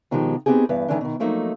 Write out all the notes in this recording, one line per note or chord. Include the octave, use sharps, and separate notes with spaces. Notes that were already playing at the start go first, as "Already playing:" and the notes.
B2 D#3 F3 G#3 F#4 G4
B3 C4 D#4 G4 G#4
E2 G2 B4
D#3 E3 G#3 A3 C#4 D4
B2 D#3
F3 F#3 A3 A#3 D#4